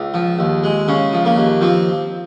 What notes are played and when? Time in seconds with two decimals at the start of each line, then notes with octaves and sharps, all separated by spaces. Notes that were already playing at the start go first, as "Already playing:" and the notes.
Already playing: C#2
0.14 F3
0.39 D#2
0.64 G#3
0.88 C#3 C#4
1.13 F3
1.25 A#3
1.36 D#2
1.61 F3 C4